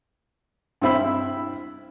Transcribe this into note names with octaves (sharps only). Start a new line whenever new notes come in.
G2 C4 E4 C5 B5 E6